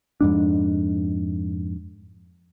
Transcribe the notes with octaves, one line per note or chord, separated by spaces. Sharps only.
F2 G#2 D4